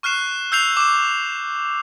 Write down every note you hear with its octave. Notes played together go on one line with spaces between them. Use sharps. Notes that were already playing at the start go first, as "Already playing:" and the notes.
C#6 F6 F#6 C7 E7
E6 G6 C7 F7
D6 E7